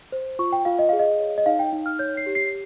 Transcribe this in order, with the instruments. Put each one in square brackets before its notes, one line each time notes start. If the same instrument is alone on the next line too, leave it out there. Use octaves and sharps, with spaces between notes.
[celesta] C5
F4 C#6
G5
F4 F5
D#5
G#4 F5
D#5
C#5
D#5
D#4 F5
G5
D#4
F6
C#5 G6
C7
G4
C7